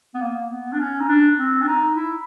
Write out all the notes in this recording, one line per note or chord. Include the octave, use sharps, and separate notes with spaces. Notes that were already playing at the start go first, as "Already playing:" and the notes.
B3
A#3
B3
D4
C#4
D#4
D4
C4
D4
D#4
E4